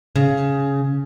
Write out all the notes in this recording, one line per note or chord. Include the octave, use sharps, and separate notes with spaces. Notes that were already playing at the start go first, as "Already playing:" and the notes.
C#3